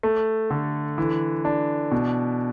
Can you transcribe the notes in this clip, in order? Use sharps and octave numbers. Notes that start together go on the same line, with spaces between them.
A3
D3
E3
D4
B2